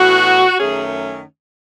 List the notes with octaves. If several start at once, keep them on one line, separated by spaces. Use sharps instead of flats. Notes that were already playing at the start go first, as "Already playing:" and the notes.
Already playing: A2 E3 B3 F#4
F#2 D#3 A3 C#4 G#4